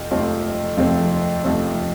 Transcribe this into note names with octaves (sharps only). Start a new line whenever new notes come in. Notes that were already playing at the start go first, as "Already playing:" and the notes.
Already playing: F2 C3 F3 C4
F2 C3 F3 A3 C4
F2 C3 F3 A3 C4
F2 C3 F3 A3 C4